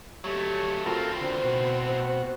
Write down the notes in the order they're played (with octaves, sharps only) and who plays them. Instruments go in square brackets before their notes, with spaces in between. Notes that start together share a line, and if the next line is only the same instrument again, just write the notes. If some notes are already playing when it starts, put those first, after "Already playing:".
[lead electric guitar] F#3 A3 [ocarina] G4 [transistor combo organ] C#5
[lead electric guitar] A2 C4 [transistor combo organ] F4 A4 A#4 [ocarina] F#4
[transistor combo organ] D3 [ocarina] C5
[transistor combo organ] B2 F#4